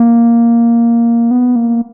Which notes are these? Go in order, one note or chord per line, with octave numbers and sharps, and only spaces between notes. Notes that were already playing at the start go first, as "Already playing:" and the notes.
Already playing: A#3
B3
A#3